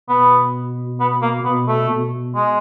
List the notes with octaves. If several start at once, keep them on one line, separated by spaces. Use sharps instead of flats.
B2 B3
B3
A#3
B2 B3
A3
B2
G#3